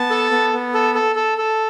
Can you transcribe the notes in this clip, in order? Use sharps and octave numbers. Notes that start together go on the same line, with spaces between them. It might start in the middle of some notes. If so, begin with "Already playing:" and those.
Already playing: B3 A5
A4
B3
B3
A4
A4
A4
A4